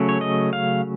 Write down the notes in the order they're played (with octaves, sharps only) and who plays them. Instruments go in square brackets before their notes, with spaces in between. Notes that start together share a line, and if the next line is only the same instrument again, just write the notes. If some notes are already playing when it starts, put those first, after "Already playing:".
Already playing: [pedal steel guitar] C#3 F#3 A3 C#4
C#5
D#5
F5